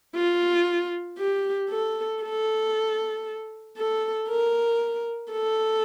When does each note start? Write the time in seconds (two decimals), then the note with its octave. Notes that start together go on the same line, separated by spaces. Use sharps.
0.15 F4
1.18 G4
1.70 A4
2.22 A4
3.77 A4
4.28 A#4
5.32 A4